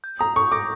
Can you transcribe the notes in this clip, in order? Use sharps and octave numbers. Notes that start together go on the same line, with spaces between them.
G6
A#5 D#6
C#6 D#6
D6 A#6